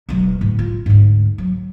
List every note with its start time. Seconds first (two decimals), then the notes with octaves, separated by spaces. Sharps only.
0.09 E1 F#3
0.41 D2 A2
0.59 F4
0.86 D2 G#2
1.38 F#3